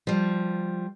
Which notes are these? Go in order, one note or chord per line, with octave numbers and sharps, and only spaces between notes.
F3 G3